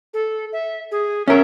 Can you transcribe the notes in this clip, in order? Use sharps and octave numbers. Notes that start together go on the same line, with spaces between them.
A4
E5
G#4
C#4 A#4 E5